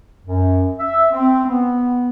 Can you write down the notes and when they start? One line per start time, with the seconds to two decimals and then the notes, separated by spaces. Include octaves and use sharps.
0.25 F#2
0.78 E5
1.11 C4
1.47 B3